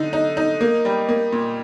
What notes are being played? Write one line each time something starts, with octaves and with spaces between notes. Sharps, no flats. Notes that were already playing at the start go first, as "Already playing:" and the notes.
Already playing: D3 D#4
D#4
D#4
A#3
G3
A#3
A#2